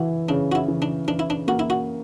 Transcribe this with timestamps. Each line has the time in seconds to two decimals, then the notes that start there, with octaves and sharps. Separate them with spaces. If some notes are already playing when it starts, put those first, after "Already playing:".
Already playing: E3 E4 F#4
0.29 C#3 D4
0.52 F#4
0.55 E4
0.68 E3
0.82 D4
1.08 E3 D4
1.19 E4
1.30 D4
1.47 A#3 F#4
1.59 E4
1.70 F#4